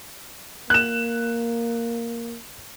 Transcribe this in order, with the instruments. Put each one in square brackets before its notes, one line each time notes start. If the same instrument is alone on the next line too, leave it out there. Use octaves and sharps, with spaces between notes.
[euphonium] A#3 [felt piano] F#6 E7